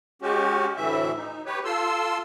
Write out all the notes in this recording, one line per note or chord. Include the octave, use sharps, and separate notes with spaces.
G#3 C#4 F#4 G4
D2 A2 E3 E5
D#4
G4 B4 C#5
F4 A4 C6 E6